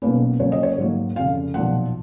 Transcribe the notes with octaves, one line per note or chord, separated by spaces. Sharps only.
B1 B2 A#3 C#4 B4
C#2 C#3 F#3 A#3 C#5
D#5
C#5
G#2 F#3 A#3
F1 F2 C#3 F5
B1 A#2 F3 F#5